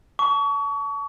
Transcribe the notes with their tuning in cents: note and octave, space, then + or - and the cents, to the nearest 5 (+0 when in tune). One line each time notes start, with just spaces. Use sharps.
A5 +0 C#6 +35